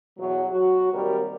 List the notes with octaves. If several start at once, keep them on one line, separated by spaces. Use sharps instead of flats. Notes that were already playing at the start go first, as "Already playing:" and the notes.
E2 B2 F#3
F#3 F#4
D#2 C3 G3 A#4